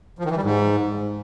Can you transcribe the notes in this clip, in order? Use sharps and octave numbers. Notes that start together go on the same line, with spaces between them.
F3
D#3
E3
G3
G#2